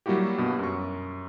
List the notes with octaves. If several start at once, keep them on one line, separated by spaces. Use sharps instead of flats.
F#3 G3 A#3 E4 F#4 G4
G2 B2
F#2 C#6